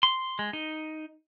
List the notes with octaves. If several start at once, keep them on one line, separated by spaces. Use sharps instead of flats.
C6
G#3
D#4